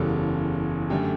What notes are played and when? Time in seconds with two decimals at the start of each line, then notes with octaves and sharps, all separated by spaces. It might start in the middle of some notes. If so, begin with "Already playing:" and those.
Already playing: F#1 E2 C#3 E3 G3 A4 A5
0.90 F#2 D3 A3 G4 G5